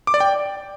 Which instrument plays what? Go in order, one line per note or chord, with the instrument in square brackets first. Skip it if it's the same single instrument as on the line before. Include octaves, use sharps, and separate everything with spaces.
[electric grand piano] D6
D5
G5